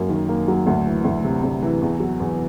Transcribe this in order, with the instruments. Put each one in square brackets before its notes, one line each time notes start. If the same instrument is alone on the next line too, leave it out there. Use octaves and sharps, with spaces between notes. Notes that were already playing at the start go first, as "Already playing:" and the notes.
Already playing: [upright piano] F#2 F#3 A#3
D#3
A#3
F#3
D2
E3
D2
C3
D2
E3
E2
F#3
E2